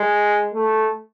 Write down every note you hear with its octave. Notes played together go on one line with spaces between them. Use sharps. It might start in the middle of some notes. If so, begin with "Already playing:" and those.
Already playing: G#3
A3